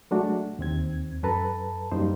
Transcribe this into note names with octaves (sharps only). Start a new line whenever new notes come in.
F#3 G#3 A3 D4 F#4
D#2 C4 G#6
F#2 A4 B4 A5 A#5
F#2 G3 A#3 D#4 C5